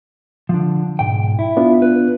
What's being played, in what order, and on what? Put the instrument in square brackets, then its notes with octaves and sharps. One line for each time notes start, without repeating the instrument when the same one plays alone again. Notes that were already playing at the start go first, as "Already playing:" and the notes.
[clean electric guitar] D3 F3
B1 G#2 G5
E4
[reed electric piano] B3 D4 F4
[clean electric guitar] B4